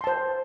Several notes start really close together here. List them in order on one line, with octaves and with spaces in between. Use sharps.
C6 A5 C5